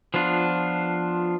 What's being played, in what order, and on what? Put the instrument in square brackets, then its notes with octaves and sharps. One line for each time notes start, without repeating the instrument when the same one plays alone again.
[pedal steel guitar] F3 B3 D4 F4